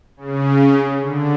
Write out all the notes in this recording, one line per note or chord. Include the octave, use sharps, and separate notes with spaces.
C#3
D3